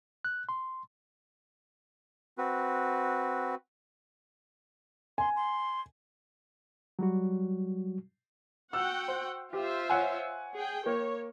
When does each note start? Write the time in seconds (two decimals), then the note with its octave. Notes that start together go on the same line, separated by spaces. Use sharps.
0.25 F#6
0.49 C6
2.38 C4 F#4 B4
5.18 G#5 C6
5.36 C6
6.99 F#3 G3 F#4
8.73 F#4 F#5 G5 E6
9.08 C5
9.53 F4 G4 C5 E5
9.89 C#5 F#5 G#5
10.55 G#4 G5
10.86 A#3 C#5